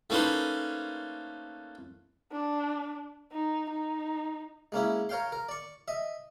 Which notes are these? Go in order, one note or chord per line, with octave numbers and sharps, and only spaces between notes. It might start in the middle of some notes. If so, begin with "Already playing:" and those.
A3 A#3 C#4 D#4 B4 C5
D4
D#4
D#4
G#3 A#3 C#4 E4
A#4 C#5 F5 G5 C6
A#4
D5 C#6
D#5 E5